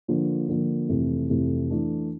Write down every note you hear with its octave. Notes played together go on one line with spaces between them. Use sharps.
D3 F3 A#3
D3 F3 A#3
F2 C3 E3 A3
F2 C3 E3 A3
E3 A3 D4